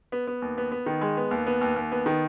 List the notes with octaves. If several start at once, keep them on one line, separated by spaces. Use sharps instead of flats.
B3
B3
D#2
B3
B3
D#3
G#3
B3
D#2
B3
D#2
D#2
B3
D#3